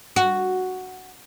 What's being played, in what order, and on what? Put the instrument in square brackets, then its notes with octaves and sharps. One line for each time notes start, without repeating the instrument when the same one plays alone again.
[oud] F#4